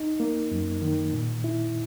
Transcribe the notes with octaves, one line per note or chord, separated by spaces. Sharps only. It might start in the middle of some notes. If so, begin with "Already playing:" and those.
Already playing: D#4
A#3
F#2
D#3
A#2
E4